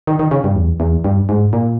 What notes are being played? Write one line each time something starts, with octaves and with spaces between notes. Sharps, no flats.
D#3
D#3
C#3
G2
E2
E2
G2
G#2
A#2